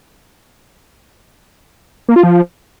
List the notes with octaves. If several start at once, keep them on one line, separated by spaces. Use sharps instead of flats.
A#3
F4
F3